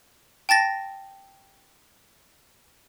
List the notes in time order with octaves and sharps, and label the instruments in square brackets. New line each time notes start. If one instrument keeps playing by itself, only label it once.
[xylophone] G5 A5 A6 A#6